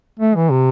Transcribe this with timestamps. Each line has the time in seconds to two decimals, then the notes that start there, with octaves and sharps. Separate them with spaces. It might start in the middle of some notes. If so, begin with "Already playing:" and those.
0.20 A3
0.35 E3
0.51 C3